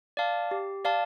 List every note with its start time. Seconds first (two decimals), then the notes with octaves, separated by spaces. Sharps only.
0.17 D5 F5 A5
0.51 G4
0.85 D5 F5 A5